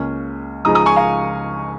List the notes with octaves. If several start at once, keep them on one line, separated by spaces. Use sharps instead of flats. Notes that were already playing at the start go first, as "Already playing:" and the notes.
Already playing: C#2 C#3 A#3 C#4
C#2 C#3 F3 G#3 D#4 A#5 D#6
A#5 D#6
G#5 C#6
F5 A#5